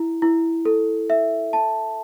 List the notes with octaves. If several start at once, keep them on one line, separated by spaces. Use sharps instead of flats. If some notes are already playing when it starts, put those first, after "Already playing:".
Already playing: E4
E4
A4
E5
A5